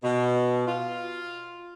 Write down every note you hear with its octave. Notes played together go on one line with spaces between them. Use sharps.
B2
F4